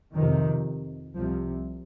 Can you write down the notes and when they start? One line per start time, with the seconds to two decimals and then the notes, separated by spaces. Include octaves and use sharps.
0.16 F2 C3 D#3
1.15 C2 C3 F3